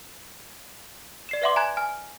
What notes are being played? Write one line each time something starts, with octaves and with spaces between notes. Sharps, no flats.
D5 C7 E7
B4 D5 E5 F#5 C6 D6
G#5 A#5 F#6 G#6
G#5 F6